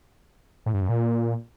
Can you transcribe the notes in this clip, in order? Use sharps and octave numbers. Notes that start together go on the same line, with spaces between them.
A2
G2
F#2
A#2